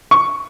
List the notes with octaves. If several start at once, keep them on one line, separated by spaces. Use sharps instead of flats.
C#6